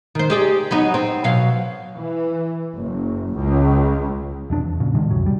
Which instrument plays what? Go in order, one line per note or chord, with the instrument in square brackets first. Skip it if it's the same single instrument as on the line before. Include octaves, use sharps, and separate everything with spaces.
[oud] D#3 C5
G4 G#4 D5
F#3 B3 D#4
C4
B2 F#3 F5
[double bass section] E3
F#1
C#2
[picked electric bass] E1 F2 D4
E2
A#2 C#3
A2 D3 D#3 G#3
F1 C2 F#2 F#3
G3